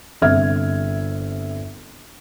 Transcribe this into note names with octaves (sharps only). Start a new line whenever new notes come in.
G1 C3 E5 F6 G#6